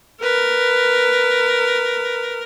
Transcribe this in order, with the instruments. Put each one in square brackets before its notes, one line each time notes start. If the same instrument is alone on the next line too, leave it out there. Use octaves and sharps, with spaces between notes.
[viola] A#4 [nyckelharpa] B4